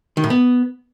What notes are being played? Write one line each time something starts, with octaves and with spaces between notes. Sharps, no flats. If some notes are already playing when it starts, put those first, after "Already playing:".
D#3
A2
B3